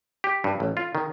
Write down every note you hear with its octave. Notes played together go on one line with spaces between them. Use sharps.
G4
G2
A1
F4
D#3